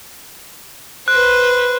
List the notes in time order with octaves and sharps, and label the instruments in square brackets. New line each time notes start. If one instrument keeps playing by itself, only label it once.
[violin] B4 C5 [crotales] F#6